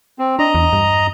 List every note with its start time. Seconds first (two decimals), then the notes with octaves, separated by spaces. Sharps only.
0.19 C4
0.39 D4 D#5 A#5
0.55 E2
0.73 G2